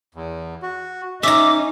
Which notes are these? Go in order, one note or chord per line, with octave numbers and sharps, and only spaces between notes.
E2
F#4
C#4 D#4 E5 A#5 D6